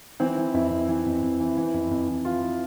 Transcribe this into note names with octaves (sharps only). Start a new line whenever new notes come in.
E3 C4
E3
F2 E4
F2
E3
F2
F2
E3
E3
F2
F2
E3
E3 F4
E3